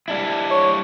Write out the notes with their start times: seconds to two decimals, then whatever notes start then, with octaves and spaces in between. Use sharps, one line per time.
0.08 G3 D4 E4
0.51 C#5